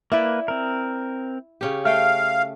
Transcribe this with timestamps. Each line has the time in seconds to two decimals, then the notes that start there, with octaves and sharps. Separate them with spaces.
0.12 A#3 E4 B4 D5 E5
0.48 C4 A#4
1.61 C#3 C#4 G4
1.85 A3 F5 G5 F6